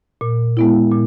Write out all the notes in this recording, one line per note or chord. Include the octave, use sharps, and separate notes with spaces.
A#2
G#3 B3 E4
A#2